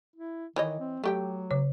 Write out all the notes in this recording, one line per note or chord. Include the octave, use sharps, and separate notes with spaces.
E4
D#3 E3 C#5 D#5
C4
F#3 A3 G4 G5
C#3 C#5